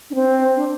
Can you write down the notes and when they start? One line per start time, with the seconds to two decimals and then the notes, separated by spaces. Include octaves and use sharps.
0.10 D4
0.15 C4
0.56 D4